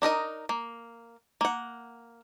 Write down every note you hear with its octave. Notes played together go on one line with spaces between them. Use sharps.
D4 D#4 A#4 D#5
A#3
A#3 F#5